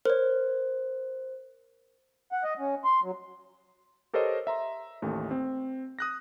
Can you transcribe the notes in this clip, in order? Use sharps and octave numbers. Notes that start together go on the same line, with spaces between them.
A#4 C5 C#5
F#5
D#5
C#4
C6
F#3
G4 A4 A#4 C5 C#5 D#5
E5 A#5 C6
A1 D#2 A3
C4
D#6 F#6 A#6